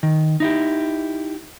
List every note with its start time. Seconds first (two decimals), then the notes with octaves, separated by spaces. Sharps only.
0.03 D#3
0.40 D#4 E4 G4